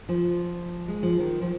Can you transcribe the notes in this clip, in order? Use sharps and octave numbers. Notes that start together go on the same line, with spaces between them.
F3
G#3
F3
D#3
F3